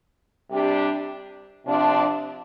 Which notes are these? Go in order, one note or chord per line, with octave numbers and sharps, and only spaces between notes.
C3 G3 D4 G4
C3 F3 D4